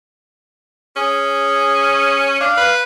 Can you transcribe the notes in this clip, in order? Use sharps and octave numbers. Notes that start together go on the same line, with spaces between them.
C#4 G#4
D4 F5
B4